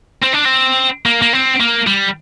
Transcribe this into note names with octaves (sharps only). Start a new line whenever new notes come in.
C4
D4
C4
A#3
A#3
C4
A#3
G3